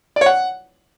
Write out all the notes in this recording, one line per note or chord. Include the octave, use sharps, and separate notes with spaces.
D5
C#5
F#5